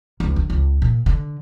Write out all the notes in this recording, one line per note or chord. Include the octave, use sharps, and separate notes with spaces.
C#2
D3
C#2
A#2
D3